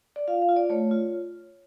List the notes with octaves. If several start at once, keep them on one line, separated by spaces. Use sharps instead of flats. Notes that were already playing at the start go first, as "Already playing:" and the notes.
D5
F4 F5
F5
F4
D5
A3 C#5
F4